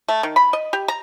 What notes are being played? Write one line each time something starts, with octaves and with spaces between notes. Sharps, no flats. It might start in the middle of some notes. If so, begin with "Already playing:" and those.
A3
D#3
B5
D#5
G4
A#5